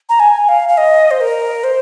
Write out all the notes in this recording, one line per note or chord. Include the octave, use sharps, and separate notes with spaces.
A#5
G#5
F5
F5
D#5
C5
A#4
C5